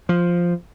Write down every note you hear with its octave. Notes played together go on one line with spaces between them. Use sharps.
F3